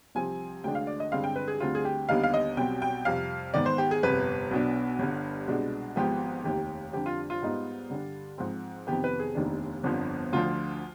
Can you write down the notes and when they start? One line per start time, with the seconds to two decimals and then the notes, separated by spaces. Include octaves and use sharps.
0.15 C2 C3 F3 C4 G#5
0.64 D2 D3 G#3 D4 G5
0.75 F5
0.87 D5
1.00 D#5
1.12 G2 D3 G#3 C4 F5
1.24 G5
1.36 B4
1.48 G#4
1.60 D2 D3 G3 C4 F4
1.75 G#4
1.85 G4
2.09 D#2 D3 G3 B3 D#4 F5
2.23 F5
2.34 D#5
2.57 B1 B2 G3 C4 G5
2.82 G5
3.05 F2 C3 G3 F5
3.54 G#2 D#3 B3 D5
3.66 C5
3.78 G4
3.91 G#4
4.03 G1 F2 C3 B4
4.51 B1 B2 B3 D4
4.99 G1 G2 D3
5.48 C2 B2 G#3 D4
5.96 G#1 G#2 F3 B3 G4
6.44 F1 D#2 D#3 G4
6.93 F2 D3 G3 D4 G4
7.06 F4
7.30 F4
7.42 G#2 G3 B3 D#4
7.90 G2 D3 G3 D4
8.38 G#2 F3 C4
8.87 F2 C3 D#3 B3 G4
9.04 B4
9.19 G#4
9.35 F1 D#2 D#3 B3 D4
9.83 G1 F2 D3 F3 B3
10.33 D2 D3 F3 F4